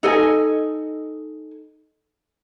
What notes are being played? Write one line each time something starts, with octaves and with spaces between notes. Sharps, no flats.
D#4 A4 D#5 G#5